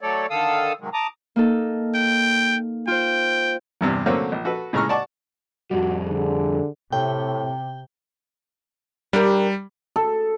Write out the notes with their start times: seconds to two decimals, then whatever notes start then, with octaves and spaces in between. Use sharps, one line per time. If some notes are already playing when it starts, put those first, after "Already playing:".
0.01 F#3 A3 A4 C#5 D5
0.30 D3 D#3 A4 F5 D#6 E6
0.80 G#2 C3 D#3 F#3 G#3
0.93 A5 A#5 D6 D#6
1.36 A#3 D#4 A4
1.94 G5
2.87 F4 C5 G5
3.81 E2 G2 C3
4.06 D3 F#3 A3 A#3 C4 C#4
4.32 A#1
4.45 F#4 A4 B4
4.73 A2 C#3 G#3 A#5 C#6 F6
4.89 D5 F#5 A5 C#6 D6
5.71 F2 G3 F#4
6.07 D3 G#4
6.92 A2 C3 G5
9.13 G3 D4 G4 A#4
9.96 A4